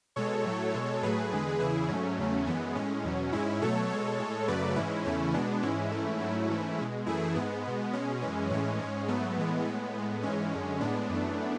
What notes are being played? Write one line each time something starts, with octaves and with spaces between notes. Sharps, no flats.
B2 G#3 A4 C#5
A2 F#3 A3
B2 G#3
A2 F#3 A3 G#4 B4
E2 D3 G#3
E2 C#3 E3 E4 G#4
G#2 F#3 A3 C#4
E2 C#3 F#3 A3
F#2 E3 G#3 B3
A2 G#3 C#4
E2 B2 F#3
G#2 G#3 C#4 E4
B2 F#3 A3 A4 C#5
B2 G#3 A4 C#5
A2 G#3
F#2 C#3 F#3 A3 B4 D5
G#2 E3 G#3 C#4 E4
E2 C#3 E3 A3 C#4 E4
B2 G#3 B3 D4
G#2 E3 G#3 C#4 E4
G#2 E3 A3
G#2 F#3 A3
G#2 E3 A3
B2 G#3
F#2 E3 A3 E4 G#4
G#2 G#3 B3
B2 G#3
B2 G#3 C#4
F#2 E3 G#3
A2 E3 G#3 C#4
G#2 G#3
G#2 F#3 A3 B3
A2 E3 G#3
A2 G#3 B3
A2 G#3
G#2 E3 G#3 C#4
F#2 D3 G#3
A2 G#3 B3 D4
F#2 E3 A3